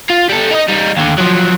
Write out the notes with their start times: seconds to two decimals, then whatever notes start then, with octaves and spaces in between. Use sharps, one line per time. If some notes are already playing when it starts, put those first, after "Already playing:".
0.10 F4
0.30 G3 A4
0.51 D#4 D#5
0.69 G3 D#4
0.97 D#2 D3
1.18 F3 F#3